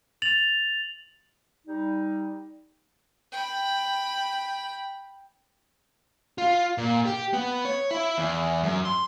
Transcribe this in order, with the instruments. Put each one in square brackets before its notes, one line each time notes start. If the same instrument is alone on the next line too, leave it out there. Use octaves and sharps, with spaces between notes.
[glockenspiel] A6 F7 F#7
[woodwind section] G3 D#4
[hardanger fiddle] G5 B5
[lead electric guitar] F4
A#2
G4
B3
C#5
E4
E2
F#2
C6